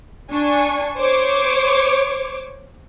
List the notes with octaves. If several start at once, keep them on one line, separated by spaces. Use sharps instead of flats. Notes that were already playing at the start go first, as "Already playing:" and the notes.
D4 G#5 C#6
C5 C#5 D6